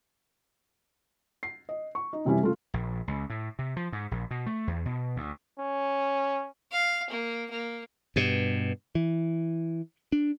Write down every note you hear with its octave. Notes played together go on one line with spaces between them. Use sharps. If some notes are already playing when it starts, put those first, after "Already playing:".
C7
D#5
C#6
D#4
F#2 C3 E3 G3 C#4 E4
C#3 A3 F4
A#1
C#2
A2
C3
F3
G#2
A#1
B2
A3
E2
B2
D2
C#4
F5
A#3
A#3
G2 B2
E3
D4